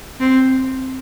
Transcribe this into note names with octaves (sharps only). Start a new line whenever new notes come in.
C4